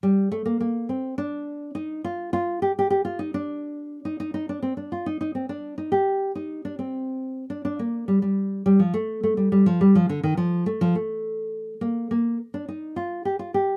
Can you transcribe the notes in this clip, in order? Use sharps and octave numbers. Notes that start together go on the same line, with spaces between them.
G3
A3
A#3
A#3
C4
D4
D#4
F4
F4
G4
G4
G4
F4
D#4
D4
D#4
D#4
D#4
D4
C4
D4
F4
D#4
D#4
C4
D4
D#4
G4
D#4
D4
C4
D4
D4
A#3
G3
G3
G3
F3
A3
A3
G3
G3
F3
G3
F3
D3
D#3
F3
A3
F3
A3
A#3
A#3
D4
D#4
F4
G4
F4
G4